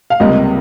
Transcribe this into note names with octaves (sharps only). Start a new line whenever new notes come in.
F5
C#2 C3 G3 A#3 D#5